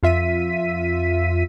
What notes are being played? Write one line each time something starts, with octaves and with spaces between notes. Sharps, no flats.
F2 F4 E5 B6 D#7